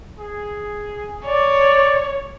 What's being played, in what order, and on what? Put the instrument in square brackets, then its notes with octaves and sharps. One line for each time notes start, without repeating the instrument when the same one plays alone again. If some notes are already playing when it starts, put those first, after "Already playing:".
[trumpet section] G#4
[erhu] C#5 [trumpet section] D5